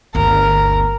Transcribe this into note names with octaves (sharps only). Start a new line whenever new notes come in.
G1 D2 A#4